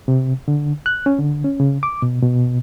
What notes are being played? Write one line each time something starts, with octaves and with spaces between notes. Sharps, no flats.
C3
D3
F#6
C#4
D3
C#4
C#3
D6
B2
B2